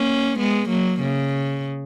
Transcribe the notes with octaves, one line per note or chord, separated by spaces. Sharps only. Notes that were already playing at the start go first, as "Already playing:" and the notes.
Already playing: A#3 C#4
G#3 B3
F#3 A#3
C#3